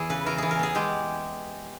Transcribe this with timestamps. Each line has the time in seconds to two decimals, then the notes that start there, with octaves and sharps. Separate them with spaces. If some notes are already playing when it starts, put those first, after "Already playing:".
Already playing: E2 E3 G#4
0.10 C#3 B4
0.26 E3 A#4
0.38 E3 G#4
0.51 A#4
0.59 B3 G#4
0.75 G#3 G4